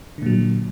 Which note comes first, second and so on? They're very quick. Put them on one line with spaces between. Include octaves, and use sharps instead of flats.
D3 A#2 F#3